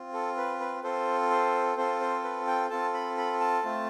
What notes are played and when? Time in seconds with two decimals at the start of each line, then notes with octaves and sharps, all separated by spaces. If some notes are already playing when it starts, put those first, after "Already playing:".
Already playing: C4 F4
0.13 A4
0.37 B4
0.60 B4
0.84 C4 F4 A4 C5
1.30 C5
1.77 C4 F4 A4 C5
2.01 C5
2.24 B4
2.47 G5
2.70 C4 F4 A4 A5
2.94 B5
3.18 B5
3.40 A5
3.64 A3 C4 F4